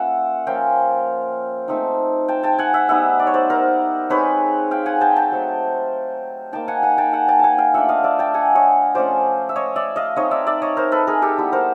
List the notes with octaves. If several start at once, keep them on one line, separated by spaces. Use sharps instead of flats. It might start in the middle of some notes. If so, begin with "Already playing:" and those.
Already playing: A#3 C#4 F4 E5 F#5
F3 A#3 C#4 F4 F5 G5
A3 C4 D#4
G5 A5
G5 A5
F#5 G#5
E5 F#5
G3 B3 D#4 E5 F#5
D5
C#5
C5 D5
A#4 C5
G#3 C4 D#4 B4 C#5
F5 G5
F#5 G#5
G5 A5
G5 A5
F#3 A3 C4
A#3 D#4 G5 A5
F#5 G#5
F#5 G#5
G5 A5
F#5 G#5
G5 A5
F#5 G#5 A5
F5 G5
A3 D4 F4 E5 F#5
D#5 F5
D5 E5
G5 A5
F#5 G#5
C#5 D#5
F3 A3 C#4 F4 C5 D5
E5
C#5 D#5
D5 E5
D#5 F5
A3 C4 D#4 C#5 D#5
D5 E5
D5 E5
C#5 D#5
A#4 C5
A4 B4
G#4 A#4
G4 A4
G3 B3 E4
A#4 C5